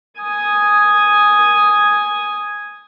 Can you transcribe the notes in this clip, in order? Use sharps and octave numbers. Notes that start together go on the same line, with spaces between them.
G#5 D#6